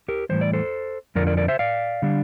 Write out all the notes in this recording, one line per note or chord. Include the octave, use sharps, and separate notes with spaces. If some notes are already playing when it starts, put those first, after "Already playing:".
G4 A#4
A2 E3 G3 C5
D5
A4 C5
F2 D3 F3 A#4 D5
A#4 D5
A#4 D5
C5 E5
D5 F5
D3 G3 D4